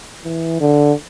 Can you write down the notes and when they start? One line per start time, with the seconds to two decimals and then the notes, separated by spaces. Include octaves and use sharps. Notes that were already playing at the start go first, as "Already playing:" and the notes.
0.24 E3
0.61 D3